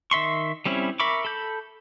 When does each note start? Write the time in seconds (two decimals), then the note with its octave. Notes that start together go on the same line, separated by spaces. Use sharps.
0.11 D#3 E5 C6 C#6
0.66 G3 C4 C#4 E4
1.00 A#4 E5 B5 C#6 D6
1.25 A4 B5 G6